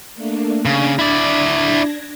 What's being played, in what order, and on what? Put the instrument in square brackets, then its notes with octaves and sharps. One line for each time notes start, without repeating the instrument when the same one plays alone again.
[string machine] A3 A#3 D4
[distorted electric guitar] C#3 [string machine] D4 G#6 A#6
[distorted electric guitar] E4 D5